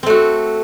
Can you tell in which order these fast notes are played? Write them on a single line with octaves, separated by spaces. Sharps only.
C4 A3 F#4